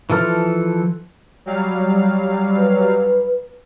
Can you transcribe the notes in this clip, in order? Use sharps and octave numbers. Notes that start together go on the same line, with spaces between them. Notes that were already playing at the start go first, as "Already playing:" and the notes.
E3 F3 A4 F6
F#3 G3 F5
B4